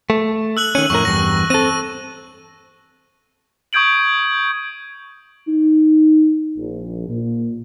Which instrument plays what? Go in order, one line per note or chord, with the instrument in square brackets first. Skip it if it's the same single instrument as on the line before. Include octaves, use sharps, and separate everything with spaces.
[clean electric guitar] A3
[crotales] E6 F#6 F#7
[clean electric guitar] D#3 C#4 [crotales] D#7
[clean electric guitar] F2 A2 A#4 [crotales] C#6
[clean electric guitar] E2 G2 [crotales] A#6
[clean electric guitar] C4 A4 [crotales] D#7
[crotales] C#6 D#6 G6 G#6 D7 F#7
[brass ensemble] D#4
A#1
A#2